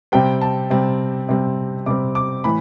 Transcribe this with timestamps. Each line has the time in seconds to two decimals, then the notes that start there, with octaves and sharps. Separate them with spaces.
0.12 C3 G3 C4 G5
0.41 A5
0.70 C3 G3 C4
1.29 C3 G3 C4
1.86 C3 G3 C4 D6
2.15 D6
2.44 A2 E3 B5